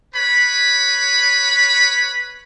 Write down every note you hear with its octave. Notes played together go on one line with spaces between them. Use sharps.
B4 C#5 B5